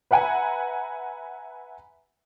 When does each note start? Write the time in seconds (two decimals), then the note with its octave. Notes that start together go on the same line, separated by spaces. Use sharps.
0.11 B4 E5 F#5 G#5 A#5 B5